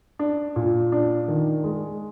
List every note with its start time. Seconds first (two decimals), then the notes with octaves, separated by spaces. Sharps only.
0.19 D4
0.56 A#2
0.92 D4
1.28 D#3
1.64 G#3